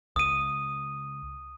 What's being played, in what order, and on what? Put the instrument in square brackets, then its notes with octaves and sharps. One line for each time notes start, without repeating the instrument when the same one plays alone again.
[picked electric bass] C#2 [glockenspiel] D#6 D#7